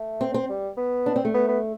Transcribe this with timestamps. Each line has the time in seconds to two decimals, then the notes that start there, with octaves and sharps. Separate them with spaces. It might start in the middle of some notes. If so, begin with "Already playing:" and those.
Already playing: A3
0.21 C4
0.34 C4
0.49 G3
0.77 B3
1.06 D4
1.16 C4
1.25 A3
1.34 B3
1.48 B3